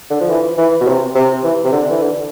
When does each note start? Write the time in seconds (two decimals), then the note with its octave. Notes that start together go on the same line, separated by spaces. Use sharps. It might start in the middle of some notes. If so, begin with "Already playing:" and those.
0.10 D3
0.21 F3
0.30 E3
0.58 E3
0.81 B2
0.87 C3
1.15 C3
1.44 E3
1.64 C3
1.72 D3
1.90 E3
2.02 D3